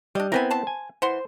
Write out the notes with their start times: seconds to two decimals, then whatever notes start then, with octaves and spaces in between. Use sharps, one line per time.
0.15 G3 D4 D#5
0.32 B3 C4 E4 A#4 B4 G#5
0.51 C5 A5
0.67 G#5
1.02 E3 C5 F#5 C6